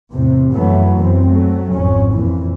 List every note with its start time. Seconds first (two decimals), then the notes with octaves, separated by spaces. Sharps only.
0.11 E2 A2 C3
0.51 F#2 E3 F#3 A3 B3
0.97 F#2 E3 B3 C4
1.27 F#3 A3
1.72 G#1 F2 C#4
2.11 F2 A#2 E3